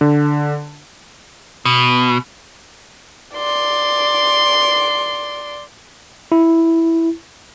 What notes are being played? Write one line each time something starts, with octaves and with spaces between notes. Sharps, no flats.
D3
B2
D5 C6
E4